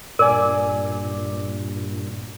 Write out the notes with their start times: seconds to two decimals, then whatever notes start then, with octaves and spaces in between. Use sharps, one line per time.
0.19 G2 A#2 A#4 D5 G#5